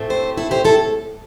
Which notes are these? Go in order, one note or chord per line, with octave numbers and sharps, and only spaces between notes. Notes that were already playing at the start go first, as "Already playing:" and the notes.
Already playing: A2 A3 C4
G4 C5
E4 A4
G4 C5
E4 A4